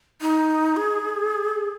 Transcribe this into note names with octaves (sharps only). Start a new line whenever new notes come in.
D#4
G#4